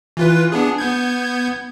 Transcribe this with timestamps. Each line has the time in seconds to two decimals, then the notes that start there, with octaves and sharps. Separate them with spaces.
0.17 E3 F4 B4
0.52 B3 D4 G#4
0.78 B3 G6 G#6